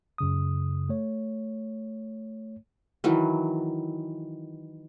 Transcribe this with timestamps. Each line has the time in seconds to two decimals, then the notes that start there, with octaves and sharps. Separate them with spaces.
0.18 F#2 C#3 D#6
0.89 A3 C#5
3.04 D#3 E3 F#3